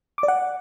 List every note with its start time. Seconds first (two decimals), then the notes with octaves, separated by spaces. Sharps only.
0.18 D6
0.23 D5
0.28 F#5